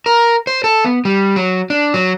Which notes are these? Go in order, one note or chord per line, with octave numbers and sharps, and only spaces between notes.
A#4
C5
A4
B3
G3
F#3
D4
F#3